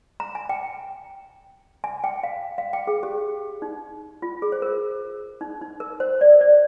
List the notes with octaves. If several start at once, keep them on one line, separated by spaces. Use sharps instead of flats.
A#5
G#5
G5
G#5
G5
F5
F5
G5
G#4
G4
D#4
F4
G#4
C5
A#4
D#4
D#4
A#4
C5
D5
D5